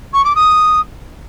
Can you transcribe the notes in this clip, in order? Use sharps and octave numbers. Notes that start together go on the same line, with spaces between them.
C#6
D6
D#6